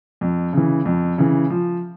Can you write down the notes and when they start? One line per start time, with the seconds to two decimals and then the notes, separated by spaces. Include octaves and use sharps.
0.21 F2
0.53 C#3 E3
0.85 F2
1.18 C#3 E3
1.50 F3